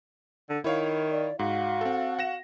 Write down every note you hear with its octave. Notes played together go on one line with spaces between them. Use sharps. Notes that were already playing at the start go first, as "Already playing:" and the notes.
D3
D#3 E4 C#5 F5
D5
G#2 F#4 F5
C4 A4
F#5 A#6 E7